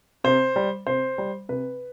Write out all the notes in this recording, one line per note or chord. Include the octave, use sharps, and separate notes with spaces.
C3 C5
G3
C3 C5
G3
C3 B4